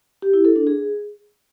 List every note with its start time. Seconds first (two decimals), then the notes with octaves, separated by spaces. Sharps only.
0.22 G4
0.34 E4
0.45 A4
0.56 D4
0.67 G#4